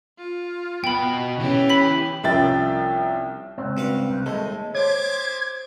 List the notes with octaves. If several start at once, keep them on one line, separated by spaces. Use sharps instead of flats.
F4
B2 G5 B5
E3 B3 C#4 E4 G4
B5 B6
C2 F3 C#4 E5 G5 A6
C#2 G#2 C4
G2 F#4 F5
C2
D#2 G#3 A3
G4 G#4 C5 C#5 D6 G#6